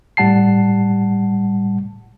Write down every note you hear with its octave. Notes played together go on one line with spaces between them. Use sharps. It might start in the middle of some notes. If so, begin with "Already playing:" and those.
A2 G3 F#5 A5 C7